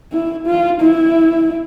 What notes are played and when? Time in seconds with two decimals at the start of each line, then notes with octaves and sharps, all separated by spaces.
0.12 E4
0.47 F4
0.81 E4